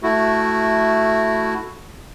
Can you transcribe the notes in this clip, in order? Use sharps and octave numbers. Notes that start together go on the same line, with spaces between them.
A3 E4 F#4